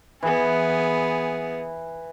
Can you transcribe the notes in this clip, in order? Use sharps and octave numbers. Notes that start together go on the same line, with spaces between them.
E3 B3 G#4